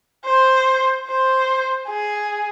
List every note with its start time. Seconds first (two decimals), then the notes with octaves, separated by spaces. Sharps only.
0.25 C5
1.08 C5
1.88 G#4